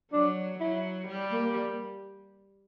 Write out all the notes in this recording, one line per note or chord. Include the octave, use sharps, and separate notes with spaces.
F#3 D4
F#3 E4
G3
A#3